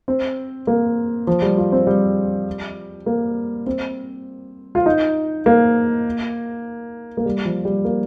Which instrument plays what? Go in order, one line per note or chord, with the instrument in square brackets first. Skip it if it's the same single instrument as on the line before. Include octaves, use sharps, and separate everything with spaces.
[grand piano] C4
A#3
F3
G3
F4
C4
G3
A#3
C4
F4
D#4
A#3
A#3
G3
F3
G3
A#3